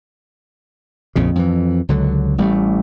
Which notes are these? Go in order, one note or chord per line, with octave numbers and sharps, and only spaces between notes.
A#1 F2 C#3
F2 E3
C#2 D3 F#3
A1 G3 A3